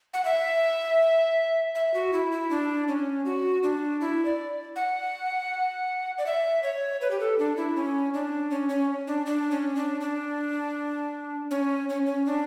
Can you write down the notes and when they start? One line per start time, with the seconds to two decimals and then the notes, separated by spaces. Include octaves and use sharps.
0.14 F#5
0.25 E5
1.75 E5
1.94 F#4
2.13 E4
2.32 E4
2.50 D4
2.88 C#4
3.25 F#4
3.63 D4
4.01 E4
4.25 D5
4.76 F#5
6.18 D5
6.26 E5
6.63 C#5
7.01 B4
7.11 G4
7.20 A4
7.39 D4
7.57 E4
7.76 C#4
8.14 D4
8.51 C#4
8.69 C#4
9.07 D4
9.26 D4
9.51 C#4
9.76 D4
10.01 D4
11.51 C#4
11.89 C#4
12.06 C#4
12.26 D4